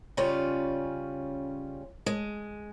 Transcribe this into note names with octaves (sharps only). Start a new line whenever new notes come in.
C#3 G3 C#4 F4
G#3